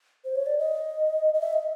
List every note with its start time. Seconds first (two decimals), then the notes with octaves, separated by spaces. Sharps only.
0.25 C5
0.35 C#5
0.46 D5
0.59 D#5
1.34 D#5
1.41 E5
1.53 D#5